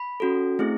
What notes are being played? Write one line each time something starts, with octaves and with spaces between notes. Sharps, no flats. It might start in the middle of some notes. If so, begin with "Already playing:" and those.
Already playing: B5
C#4 F#4 A4
A3 C4 E4 G#4